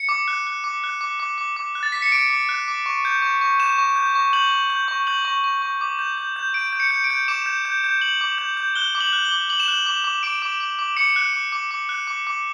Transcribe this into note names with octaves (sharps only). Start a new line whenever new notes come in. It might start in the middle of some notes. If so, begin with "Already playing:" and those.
Already playing: C#7
D6
F#6
F#6
D6
F#6
D6
D6
D6
D6
F#6
A6
D6 B6
C#7
D6 D7
D6
F#6
D6
C#6
G6
C#6
C#6
G6 E7
C#6
G6
C#6
G6 F#7
G6
G6
C#6
G6 F#7
C#6
C#6
C#6
D6
G6
G6
G6
G6 D7
G6
C#7
G6
D7
G6
D6 E7
G6
G6
G6
G6 F#7
D6
G6
G6
F#6 G7
D6
F#7
F#6
G7
D6
D6 F#7
E7
F#6 F#7
D6
D6
D6 D7
D6
D6
D6
D6 C#7
F#6
D6
D6
D6
F#6
D6
D6